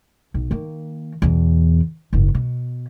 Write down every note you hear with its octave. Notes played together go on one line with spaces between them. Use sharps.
B1
D#3 A#3
E2 B2
F#1 G#2
B2